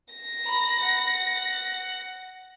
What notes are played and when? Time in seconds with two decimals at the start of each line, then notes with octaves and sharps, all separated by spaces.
0.14 A#6
0.45 A#5 B5
0.83 F#5